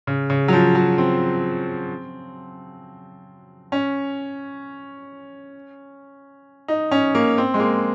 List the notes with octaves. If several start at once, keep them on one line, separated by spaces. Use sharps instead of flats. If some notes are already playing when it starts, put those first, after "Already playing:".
C#3
C#3
F#3
F3
F#3
C4
C#4
D#4
C#4
A#3
C4
G#3
A#3